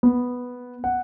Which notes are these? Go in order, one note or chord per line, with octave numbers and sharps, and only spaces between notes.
B3
F#5